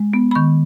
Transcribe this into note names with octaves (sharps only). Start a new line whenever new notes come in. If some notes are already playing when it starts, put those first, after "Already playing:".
Already playing: G#3
B3
B5
D#3 C#6